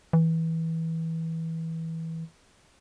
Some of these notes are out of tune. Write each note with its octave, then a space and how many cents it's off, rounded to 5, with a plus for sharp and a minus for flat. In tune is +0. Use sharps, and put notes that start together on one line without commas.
E3 -20